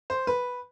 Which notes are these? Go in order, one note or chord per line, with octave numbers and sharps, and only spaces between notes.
C5
B4